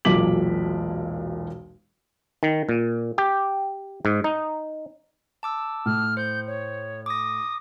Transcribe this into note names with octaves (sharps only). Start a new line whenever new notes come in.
E1 B1 A#2 D6 B6 F#7
D#3
A#2
G4
G#2
D#4
A5 D6 E6
A2 F6
C5 G6
C#5
D6 D#6 A#6